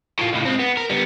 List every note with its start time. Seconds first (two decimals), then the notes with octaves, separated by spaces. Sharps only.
0.19 A2 F4
0.33 C#2 A2
0.45 G#3 C4
0.59 B3
0.77 A#4
0.90 G3 B3